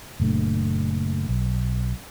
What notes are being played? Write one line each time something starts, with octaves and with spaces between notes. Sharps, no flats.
F#1 A#2 A3 D4
B1